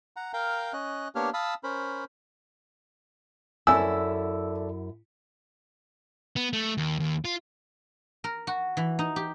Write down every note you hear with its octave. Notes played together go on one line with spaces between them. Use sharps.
F#5 A#5
A#4 F5 G5 A#5
C#4 D#5 F#6
A#3 B3 D4 G4 C#5 F6
F5 A5 B5 D#6 E6
C#4 A#4 C5 B5
F#2 E4 A4 D5 E5 G#5 E6
B3
A3
D#2
D#2
F4
A#4
F#4
E3
D#4
G4